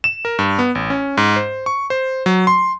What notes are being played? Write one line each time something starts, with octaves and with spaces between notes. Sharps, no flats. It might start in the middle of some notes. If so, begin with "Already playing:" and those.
E7
A#4
G2
B3
A1
C#4
G#2
C5
C#6
C5
F#3
C6